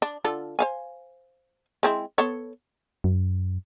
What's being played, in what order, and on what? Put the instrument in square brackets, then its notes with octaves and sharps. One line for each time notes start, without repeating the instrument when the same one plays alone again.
[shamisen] D4
D3 F4 A4
C5 F5 G#5
G#3 C4 E4
B3 A4 C#5
[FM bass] F#2